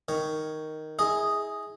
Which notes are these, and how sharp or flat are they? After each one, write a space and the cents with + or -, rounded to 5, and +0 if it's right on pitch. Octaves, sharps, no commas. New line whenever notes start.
D#3 +0 C#5 +0
E4 -30 G#4 +0 D#5 +0